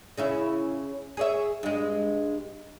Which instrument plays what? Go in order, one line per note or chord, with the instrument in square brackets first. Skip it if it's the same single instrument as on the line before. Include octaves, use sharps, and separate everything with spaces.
[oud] C#3 C#4 E4
G#4 C#5 E5
G2 G#3